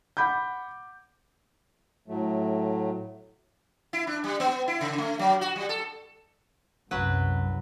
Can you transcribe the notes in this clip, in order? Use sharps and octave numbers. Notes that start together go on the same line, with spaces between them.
F#5 B5 D6 G6
A2 F#3 A3
E4
D4
G3
B3
E4
C#3
A3
F#3
F#4
G3
A4
C2 F#2 F#3 B4